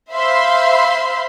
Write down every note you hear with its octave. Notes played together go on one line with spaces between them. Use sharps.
C5 E5 F5 B5 C6